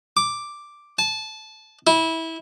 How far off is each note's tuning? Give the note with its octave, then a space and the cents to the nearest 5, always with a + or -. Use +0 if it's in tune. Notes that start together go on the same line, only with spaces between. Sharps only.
D6 +0
A5 -20
E4 -20